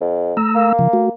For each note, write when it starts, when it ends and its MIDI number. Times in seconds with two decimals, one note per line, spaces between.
0.01 0.34 41
0.37 0.72 57
0.37 0.72 82
0.37 0.72 88
0.55 1.12 58
0.79 0.88 49
0.79 0.88 53
0.93 1.09 57
0.93 1.09 66